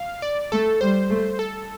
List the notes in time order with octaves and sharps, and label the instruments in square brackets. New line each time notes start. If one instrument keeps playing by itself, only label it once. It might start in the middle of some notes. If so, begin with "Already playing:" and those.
Already playing: [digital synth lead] F5
D5
[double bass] A3 [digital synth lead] A4
[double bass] G3 [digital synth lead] C5
[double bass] A3
[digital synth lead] A4